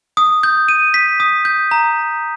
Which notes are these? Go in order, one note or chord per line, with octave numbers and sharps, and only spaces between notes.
D#6
G6
D#7
B6
D#6
G6
A#5